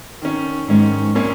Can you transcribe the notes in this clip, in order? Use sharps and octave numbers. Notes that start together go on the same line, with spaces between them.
D#3 C#4
G#2 D#3 C#4
A#2 A#3 C#4